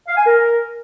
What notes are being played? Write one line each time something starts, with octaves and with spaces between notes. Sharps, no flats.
F5
G#5
A#4